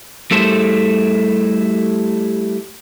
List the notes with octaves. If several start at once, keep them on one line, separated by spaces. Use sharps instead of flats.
G3 A3 E4 A4 C5